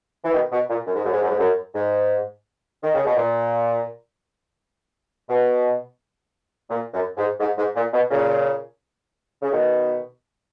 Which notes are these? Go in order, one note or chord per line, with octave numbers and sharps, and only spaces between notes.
E3
B2 D#3
B2
A#2
F#2
G#2
F#2
G#2
F#2
G#2
F#2
G#2
D#3
C#3
B2
A#2
B2
A#2
F#2
G#2
G#2
G#2
A#2
B2
A#2 C#3
C#3
B2 D#3